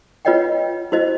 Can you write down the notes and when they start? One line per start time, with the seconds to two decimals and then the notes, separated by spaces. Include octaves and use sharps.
0.25 F4 B4 C#5 D#5 F#5 G5
0.92 E4 F#4 C5 D#5